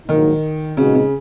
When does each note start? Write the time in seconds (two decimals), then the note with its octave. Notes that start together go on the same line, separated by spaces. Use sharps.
0.08 A#1 G#2 D#3 F#3 A#3 D#4
0.77 A#2 C#3 G#3 D#4 F#4 B4
0.95 C#3